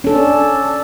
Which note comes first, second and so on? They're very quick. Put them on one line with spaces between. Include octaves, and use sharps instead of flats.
C#4 A4 D4